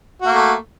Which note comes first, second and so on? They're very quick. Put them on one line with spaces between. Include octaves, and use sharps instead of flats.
F#4 A#3 A3